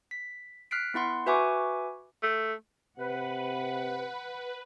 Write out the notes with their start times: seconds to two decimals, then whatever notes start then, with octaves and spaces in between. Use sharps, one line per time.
0.11 B6
0.71 F6 F#6 B6 C7 D7
0.94 B3 E4 F#5 C6
1.26 F#4 B4 E5 G#5 C#6 D6
2.23 A3
2.99 C3 B4 F#5